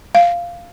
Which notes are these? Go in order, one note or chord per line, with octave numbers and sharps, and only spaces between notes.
F5